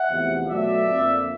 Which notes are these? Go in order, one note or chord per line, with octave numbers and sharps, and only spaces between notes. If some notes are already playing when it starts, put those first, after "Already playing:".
Already playing: E5 F#5
E2 C3 F3 A3
B2 F#3 A3 D5 E5
F2 D3 F3 A#3